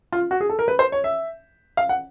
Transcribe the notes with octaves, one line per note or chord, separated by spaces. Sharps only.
F4
F#4
G#4
A4
A#4
B4
C5
C#5
E5
F5
F#5